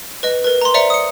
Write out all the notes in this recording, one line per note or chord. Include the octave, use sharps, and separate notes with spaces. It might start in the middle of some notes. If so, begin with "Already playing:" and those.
B4 D#5
A#4 B4
A#5 C6
C5 D5 E5 A#5 C#7
D#6 C#7